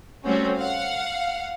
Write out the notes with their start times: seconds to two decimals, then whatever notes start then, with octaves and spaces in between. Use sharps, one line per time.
0.24 G3 A3 C4 C#4 F#4
0.57 F5 F#5